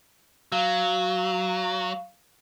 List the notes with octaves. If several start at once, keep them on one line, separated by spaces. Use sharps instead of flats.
F#3 F5